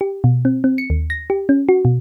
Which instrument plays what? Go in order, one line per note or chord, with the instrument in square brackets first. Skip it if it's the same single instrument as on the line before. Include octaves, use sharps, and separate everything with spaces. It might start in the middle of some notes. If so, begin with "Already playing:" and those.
[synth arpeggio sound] G4
B2
C4
C4
C#7
D#2
A#6
G4
C#4
F#4
B2